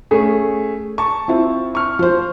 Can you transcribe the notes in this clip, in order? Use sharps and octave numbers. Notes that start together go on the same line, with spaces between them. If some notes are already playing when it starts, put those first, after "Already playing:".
A3 C#4 G#4
A5 C#6
C4 E4 F4
C#6 F6
F3 C5